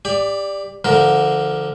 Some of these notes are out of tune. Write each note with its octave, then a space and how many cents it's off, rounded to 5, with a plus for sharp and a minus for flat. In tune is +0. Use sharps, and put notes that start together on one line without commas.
G4 +25 D5 +0
D3 +0 F3 -25 A#4 +0